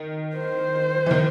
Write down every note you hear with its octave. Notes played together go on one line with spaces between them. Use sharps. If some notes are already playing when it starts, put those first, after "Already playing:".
Already playing: D#3
C5
E3
D#3